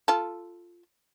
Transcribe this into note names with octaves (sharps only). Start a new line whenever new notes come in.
F4 A4